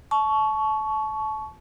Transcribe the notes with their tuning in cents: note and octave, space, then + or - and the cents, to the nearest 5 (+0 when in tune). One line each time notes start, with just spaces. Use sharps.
A5 -30 C#6 +10